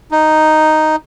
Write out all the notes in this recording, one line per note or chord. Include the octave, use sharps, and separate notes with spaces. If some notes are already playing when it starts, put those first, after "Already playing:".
D#4